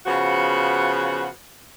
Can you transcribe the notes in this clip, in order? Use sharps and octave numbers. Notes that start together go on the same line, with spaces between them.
C#3 F3 B3 F#4